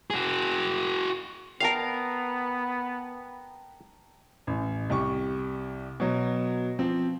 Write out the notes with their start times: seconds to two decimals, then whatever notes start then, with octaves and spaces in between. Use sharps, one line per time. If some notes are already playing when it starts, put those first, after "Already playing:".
0.10 F#4 G#4
1.60 B3 A#4 F5 G5 A5 A#5
4.47 A1
4.90 C2 G4 C#6
6.00 B2 F#3
6.79 F3 C4